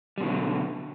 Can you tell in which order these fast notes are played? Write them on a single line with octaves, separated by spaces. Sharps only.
G3 B2 D#3 F#3 D3